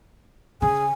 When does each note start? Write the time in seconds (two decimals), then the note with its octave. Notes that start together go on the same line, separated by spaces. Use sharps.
0.62 C#3 G#4 G#5